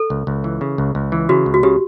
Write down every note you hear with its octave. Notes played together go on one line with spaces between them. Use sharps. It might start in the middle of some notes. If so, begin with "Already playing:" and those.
Already playing: A4
C#2
C#2
E3
C#3
C#2
C#2
E3
C#3 F#4
C#2
F#4
C#3 G4